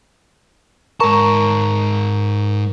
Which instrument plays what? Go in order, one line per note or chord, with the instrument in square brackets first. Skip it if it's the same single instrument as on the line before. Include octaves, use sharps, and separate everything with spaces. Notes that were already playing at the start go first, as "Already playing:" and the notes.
[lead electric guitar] G#2 A5 [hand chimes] A#4 A#5 C#6